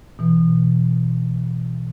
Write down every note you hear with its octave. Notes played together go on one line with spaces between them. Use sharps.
B2 E3